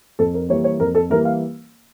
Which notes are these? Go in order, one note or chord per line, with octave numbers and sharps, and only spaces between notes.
F2 A4
A#4
E3 G3 A#3 C#5
C#5
F2 A#4
A4
E3 G3 A#3 A#4
F5